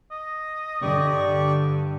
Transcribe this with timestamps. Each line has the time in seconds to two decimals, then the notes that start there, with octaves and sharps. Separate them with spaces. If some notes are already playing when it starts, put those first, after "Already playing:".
0.11 D#5
0.82 G2 D3 G4 D5 C#6